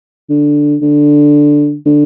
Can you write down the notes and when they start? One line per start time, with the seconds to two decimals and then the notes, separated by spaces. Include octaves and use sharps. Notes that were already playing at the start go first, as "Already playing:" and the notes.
0.29 D3
0.82 D3
1.86 D3